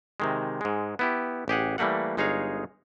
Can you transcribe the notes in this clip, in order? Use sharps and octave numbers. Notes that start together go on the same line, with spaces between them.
C3 D#3 G#3
G#2 G#3
B3 E4 G4
A1 G4 G#4 F#5
E3 G3 A3 A#3 F#5
G1 G#3 D#4 G#4 C#5 F5